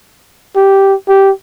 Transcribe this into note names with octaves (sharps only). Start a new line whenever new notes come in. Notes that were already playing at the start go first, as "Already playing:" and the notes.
G4
G4